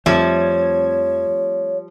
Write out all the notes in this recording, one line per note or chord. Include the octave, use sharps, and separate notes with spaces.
F2 F3 G3 A3 C4 C#5 E5 G#6